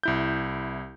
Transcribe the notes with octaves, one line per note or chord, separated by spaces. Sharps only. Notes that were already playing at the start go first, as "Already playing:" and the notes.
C2 E4 G6